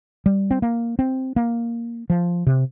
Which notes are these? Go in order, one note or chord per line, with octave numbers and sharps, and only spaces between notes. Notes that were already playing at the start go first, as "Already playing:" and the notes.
G3
C4
A#3
C4
A#3
F3
C3